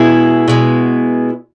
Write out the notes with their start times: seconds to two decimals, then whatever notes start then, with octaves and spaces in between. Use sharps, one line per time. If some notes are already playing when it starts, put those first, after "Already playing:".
Already playing: B2 G#3 B3 E4 G#4
0.48 B2 G#3 B3